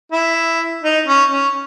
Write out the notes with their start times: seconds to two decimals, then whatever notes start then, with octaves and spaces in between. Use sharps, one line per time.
0.12 E4
0.83 D#4
1.07 C#4
1.31 C#4